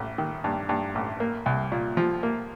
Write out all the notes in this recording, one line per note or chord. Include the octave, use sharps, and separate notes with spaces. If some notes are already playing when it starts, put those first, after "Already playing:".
Already playing: A1
D#3
G2
G2
A1
A#3
C2
A#2
F3
A#3